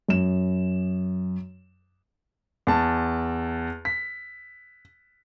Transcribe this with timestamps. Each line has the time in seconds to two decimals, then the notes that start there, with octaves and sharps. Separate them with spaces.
0.08 F#2 E7
2.67 E2 A5
3.85 B6